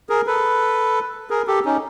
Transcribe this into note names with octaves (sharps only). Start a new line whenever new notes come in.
G#4 A#4
A4 B4
G#4 A#4
G4 A4
C#4 D#4